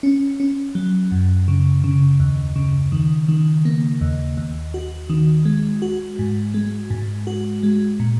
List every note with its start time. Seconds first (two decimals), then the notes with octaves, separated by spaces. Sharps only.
0.03 C#4
0.40 C#4
0.75 F#3
1.12 F#2
1.48 C#3
1.84 C#3
2.20 D#2
2.56 C#3
2.92 D#3
3.28 D#3
3.65 A#3
4.01 D#2
4.37 D#2
4.74 F#4
5.09 D#3
5.45 G#3
5.82 F#4
6.19 G#2
6.54 G#3
6.90 G#2
7.27 F#4
7.63 G#3
8.00 A#2